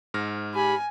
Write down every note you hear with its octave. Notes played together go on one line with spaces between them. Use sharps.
G#2 F6 A#6
G4 G#5 B5